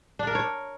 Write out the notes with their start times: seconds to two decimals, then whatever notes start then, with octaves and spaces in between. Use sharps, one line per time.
0.19 D4
0.27 A#4
0.35 C#5